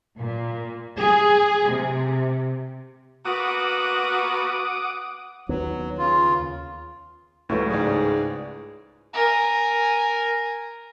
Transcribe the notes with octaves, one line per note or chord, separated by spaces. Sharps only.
A#2
G#4
C3
A#3 B3 F#4 F#5 D6 D#6
D#2 D#3 F#3 B3
C#3 F4
C#2 A2 E3 F#3 A3
G#2 G#4 D5
A#4 G#5